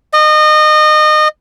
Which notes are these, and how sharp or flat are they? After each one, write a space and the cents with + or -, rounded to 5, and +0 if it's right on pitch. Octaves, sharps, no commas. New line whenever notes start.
D#5 -25